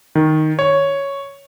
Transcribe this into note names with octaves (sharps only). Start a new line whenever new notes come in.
D#3
C#5